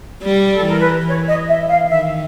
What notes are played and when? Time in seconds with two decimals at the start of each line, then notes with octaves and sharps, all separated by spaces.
0.23 G3
0.51 A4
0.65 E3 A#4
0.79 B4
1.06 E3 C#5
1.27 D#5
1.48 E5
1.68 F5
1.89 D#3 E5